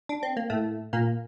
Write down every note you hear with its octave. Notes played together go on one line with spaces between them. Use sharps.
D4
C4
A#3
A2 A3
A#2 A#3